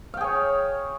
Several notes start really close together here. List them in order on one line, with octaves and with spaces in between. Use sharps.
F5 G5 G#4 C#5